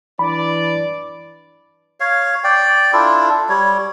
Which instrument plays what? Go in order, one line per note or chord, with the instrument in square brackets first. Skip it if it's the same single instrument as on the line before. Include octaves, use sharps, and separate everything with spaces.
[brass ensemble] E3 D4 D5 [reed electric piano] B5
[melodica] C#5 F5
D5 G5
D4 E4 F4 A4
G3 C#5